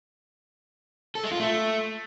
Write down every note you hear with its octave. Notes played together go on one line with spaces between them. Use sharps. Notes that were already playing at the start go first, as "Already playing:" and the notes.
A4
G#3
F4
A3